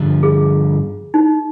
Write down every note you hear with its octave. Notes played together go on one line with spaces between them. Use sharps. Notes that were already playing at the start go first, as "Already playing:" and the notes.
Already playing: G2 D3 F3
G#4
D#4